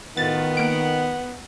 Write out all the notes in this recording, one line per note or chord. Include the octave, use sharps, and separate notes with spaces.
A2 D#3 B3 F4 F#4 A6
A#3 F#5 D7